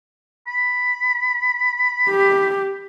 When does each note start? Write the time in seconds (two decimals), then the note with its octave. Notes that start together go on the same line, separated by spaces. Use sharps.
0.47 B5
2.10 G4